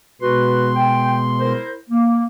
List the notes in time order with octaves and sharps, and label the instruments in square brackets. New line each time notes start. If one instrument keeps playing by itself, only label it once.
[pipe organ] B2 G#3 C6 [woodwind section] F#4 B4
[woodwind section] G5
E4 A#4 C5
A#3